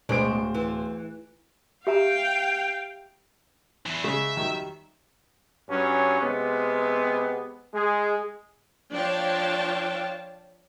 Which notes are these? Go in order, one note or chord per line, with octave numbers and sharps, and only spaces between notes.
D1 B2 G#3 D4 C5 D7
E3
G4 E5 F5 G5 A#5
E2 E3
C#3 G#3 E5
D#3 F#3 G3
G2 F#3 C#4
C3 G#3 B3
G#3 G#4
F3 D4 C#5 F5 G5 A5